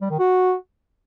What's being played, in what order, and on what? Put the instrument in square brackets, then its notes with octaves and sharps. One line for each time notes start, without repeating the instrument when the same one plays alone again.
[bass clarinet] G3
D#3
F#4